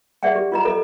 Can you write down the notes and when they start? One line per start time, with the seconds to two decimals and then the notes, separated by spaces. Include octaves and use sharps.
0.23 G#4 D5 E5 F#5 G5
0.35 G4
0.52 F4 D#5 A#5
0.65 A4 D#5